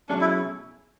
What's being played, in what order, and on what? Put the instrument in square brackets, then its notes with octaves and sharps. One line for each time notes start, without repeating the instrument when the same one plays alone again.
[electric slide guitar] B2 F#3 A3 C#4 G#4 [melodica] D4
[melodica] E4